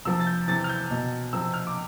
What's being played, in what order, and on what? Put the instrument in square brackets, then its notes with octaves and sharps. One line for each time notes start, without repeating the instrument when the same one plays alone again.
[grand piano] C3 F3 E6
A6
G6
C3 E3 A6
F6
G6
B2
C3 F3 E6
F6
D6